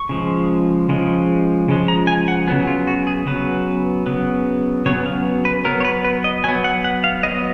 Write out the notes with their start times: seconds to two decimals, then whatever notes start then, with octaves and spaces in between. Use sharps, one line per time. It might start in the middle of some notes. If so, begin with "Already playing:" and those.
Already playing: C#6
0.09 C#3 F3 G#3
0.89 C#3 F3 G#3
1.68 C#3 F3 G#3
1.88 A#5
2.07 G#5
2.28 F#5
2.47 C#3 F#3 B3 G#4
2.67 F4
2.87 F#4
3.07 G#4
3.27 C#3 F#3 B3 B4
4.06 C#3 F#3 B3
4.86 C#3 F#3 B3 C#5
5.06 F5
5.45 B4
5.65 F#3 B3 A#4
5.80 C#5
5.85 B4
6.04 B4
6.24 D#5
6.44 F#3 B3 G#5
6.64 F#5
6.84 F#5
7.04 F5
7.23 F#3 B3 D#5